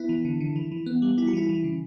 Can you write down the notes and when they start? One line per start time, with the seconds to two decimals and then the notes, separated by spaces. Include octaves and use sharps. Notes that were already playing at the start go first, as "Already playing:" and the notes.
Already playing: B3 E4
0.09 E3
0.25 D3
0.41 D3
0.56 E3
0.72 E3
0.86 B3
1.02 G3
1.17 G3 E4
1.27 F#4
1.33 E3 E4
1.49 E3
1.64 C#3